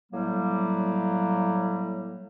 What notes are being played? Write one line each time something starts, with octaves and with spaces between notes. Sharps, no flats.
A2 F#3 G3 A#3